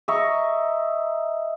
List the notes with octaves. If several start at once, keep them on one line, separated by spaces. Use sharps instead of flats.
D#5 E5 A#5 C#6